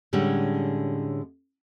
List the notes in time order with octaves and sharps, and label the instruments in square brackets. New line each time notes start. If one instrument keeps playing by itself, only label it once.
[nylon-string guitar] A2 D3 G3 G#3 C#4